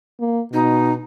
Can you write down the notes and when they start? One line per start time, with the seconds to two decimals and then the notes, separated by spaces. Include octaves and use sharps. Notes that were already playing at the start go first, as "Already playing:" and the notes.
0.20 A#3
0.53 B2 D#4